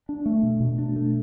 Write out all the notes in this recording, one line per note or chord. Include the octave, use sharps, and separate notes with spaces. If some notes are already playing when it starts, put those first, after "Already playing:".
D4
A3
B2
B2
D4
A3